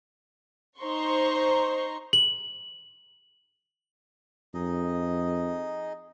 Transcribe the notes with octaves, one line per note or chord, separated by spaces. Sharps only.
D#4 C5 A#5 C6 C#6
F#7
F2 D#4 G#4 D#5